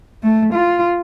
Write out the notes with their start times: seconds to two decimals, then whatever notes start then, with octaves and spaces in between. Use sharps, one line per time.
0.23 A3
0.54 F4